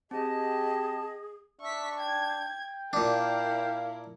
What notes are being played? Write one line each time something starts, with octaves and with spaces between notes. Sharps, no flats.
C4 G4 G#4 D#5 A5
D4 E5 C#6 B6
G5 G#6
A#2 D4 E4 A#4 F5